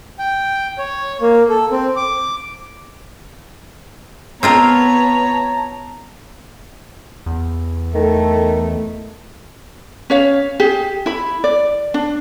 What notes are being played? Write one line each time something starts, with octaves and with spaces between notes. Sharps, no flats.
G5
C#5
A#3
A4
C4
D6
B3 C4 F4 A#4 C#5 A5 A#5
E2
D#3 A3 A4
C#4 C#5 F5
G4 G#4
E4 B5
D5
D4